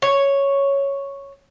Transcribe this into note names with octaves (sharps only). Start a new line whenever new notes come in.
C#5